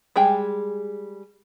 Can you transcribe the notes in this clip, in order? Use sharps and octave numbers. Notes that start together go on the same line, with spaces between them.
G3 G#3 G#4 G5